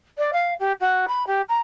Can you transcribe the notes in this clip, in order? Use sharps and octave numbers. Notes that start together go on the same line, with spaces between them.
D5
F5
G4
F#4
B5
G4
A#5